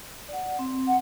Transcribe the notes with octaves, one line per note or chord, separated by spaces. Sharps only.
D5 F#5
C4
F#5